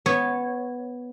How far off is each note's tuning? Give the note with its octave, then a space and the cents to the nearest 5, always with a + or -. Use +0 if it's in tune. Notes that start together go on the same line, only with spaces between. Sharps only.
B3 +0 C#5 -10